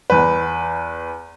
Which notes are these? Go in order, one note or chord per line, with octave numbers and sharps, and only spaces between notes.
E2 B4